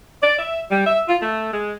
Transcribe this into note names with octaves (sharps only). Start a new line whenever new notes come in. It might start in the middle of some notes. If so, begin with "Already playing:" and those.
D5
E5
G3
E5
F4
A3
G#3